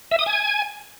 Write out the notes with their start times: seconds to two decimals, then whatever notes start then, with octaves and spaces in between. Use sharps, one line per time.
0.11 E5
0.19 D#6
0.26 G#5